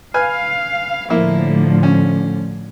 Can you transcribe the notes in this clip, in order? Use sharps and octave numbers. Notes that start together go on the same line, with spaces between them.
B4 F5 G#5 F6
A2 D3 F3 A#3 E4
C#4